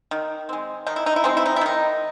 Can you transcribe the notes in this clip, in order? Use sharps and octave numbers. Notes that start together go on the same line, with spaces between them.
D#3
G#3 C4
D#3 D#4
E4
D#4
E4
G#3 C4 D#4
E4
D#4
E4
D#3 D#4